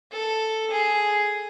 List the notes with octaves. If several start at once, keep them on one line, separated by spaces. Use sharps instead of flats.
A4
G#4